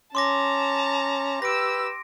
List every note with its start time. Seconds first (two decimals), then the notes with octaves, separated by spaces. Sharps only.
0.15 C#4 A5 A#5 C6 D6 A#6
1.42 G4 B4 E6 A#6 D7